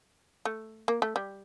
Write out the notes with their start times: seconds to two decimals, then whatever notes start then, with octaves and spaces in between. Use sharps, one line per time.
0.45 A3
0.88 A#3
1.02 A3
1.16 G3